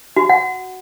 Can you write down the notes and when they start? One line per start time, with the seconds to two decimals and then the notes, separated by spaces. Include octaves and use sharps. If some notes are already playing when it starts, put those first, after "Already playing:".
0.16 F#4
0.29 F#5